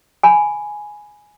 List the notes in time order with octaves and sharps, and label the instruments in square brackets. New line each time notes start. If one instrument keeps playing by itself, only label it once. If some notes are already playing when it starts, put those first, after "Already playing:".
[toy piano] G#5 B5